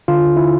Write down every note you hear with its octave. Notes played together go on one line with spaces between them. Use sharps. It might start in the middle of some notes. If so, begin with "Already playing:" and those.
D3 F4
E4